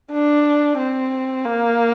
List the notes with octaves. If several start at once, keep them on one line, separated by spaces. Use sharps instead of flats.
D4
C4
A#3